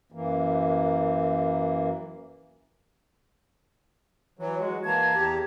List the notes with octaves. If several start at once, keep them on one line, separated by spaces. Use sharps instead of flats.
F#2 E3 A#3
E3 F#3 C#5
G#3 F#4
E3 A#3 A5 A#5 G#6
E2 G4